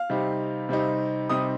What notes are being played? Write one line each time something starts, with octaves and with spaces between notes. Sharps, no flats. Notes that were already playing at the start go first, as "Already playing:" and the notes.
Already playing: F5
C3 G3 C4 D#4
C3 G3 C4 D#4
C3 G3 C4 D#4 D#6